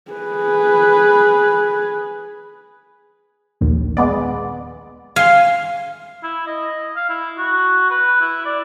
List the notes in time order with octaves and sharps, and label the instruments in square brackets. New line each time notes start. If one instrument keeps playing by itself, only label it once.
[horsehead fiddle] G#4 B4
[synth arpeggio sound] A#1 D#2
G#3 B3 D5
[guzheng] F5 [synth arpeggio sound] G#5 C6
[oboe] E4
D#5
F5
E4
F#4
B4
E4
D5